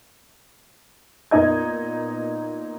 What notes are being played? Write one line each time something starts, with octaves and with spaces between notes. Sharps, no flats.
A#2 B3 D#4 D#5 G#6